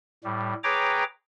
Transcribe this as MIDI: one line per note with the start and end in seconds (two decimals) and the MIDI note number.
0.24 0.54 45
0.24 0.54 55
0.64 1.04 68
0.64 1.04 71
0.64 1.04 73
0.64 1.04 79
0.64 1.04 82
0.64 1.04 86